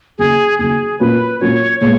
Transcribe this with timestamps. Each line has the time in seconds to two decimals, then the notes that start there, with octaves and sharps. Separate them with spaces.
0.18 D#2 C#3 F#3 G#4
0.58 D#2 C#3 F#3 G#4
0.99 A#2 F#3 C#4 F4 A#4 B4
1.40 A#2 F#3 C#4 F4 A#4 C#5
1.80 A#2 G#3 B3 C#5